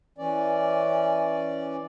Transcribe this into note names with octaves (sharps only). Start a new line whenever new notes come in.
E3 C#4 D5